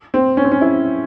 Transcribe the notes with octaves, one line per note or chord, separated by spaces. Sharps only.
C4
C#4
C4
C#4
E4